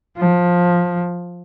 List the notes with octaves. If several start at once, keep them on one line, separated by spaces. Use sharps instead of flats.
F3